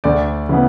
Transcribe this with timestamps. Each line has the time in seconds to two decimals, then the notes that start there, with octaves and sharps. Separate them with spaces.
0.04 D2 D5
0.49 C#3 E3 B3